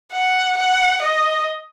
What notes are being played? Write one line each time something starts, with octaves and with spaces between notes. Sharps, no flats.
F#5
F#5
D#5